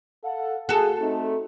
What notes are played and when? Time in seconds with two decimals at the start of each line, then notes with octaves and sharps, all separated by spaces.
0.23 A4 F5 F#5
0.69 F#4 G#4 A4
1.00 A3 C4 D#4